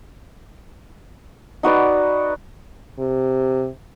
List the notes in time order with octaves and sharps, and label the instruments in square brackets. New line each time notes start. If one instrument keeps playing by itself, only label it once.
[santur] D#4 F#4 B4 D5
[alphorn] C3